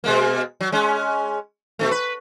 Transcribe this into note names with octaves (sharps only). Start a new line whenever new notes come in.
B2 G#3 A#3
F#3
G#3 C#4
B2 D3 A3
B4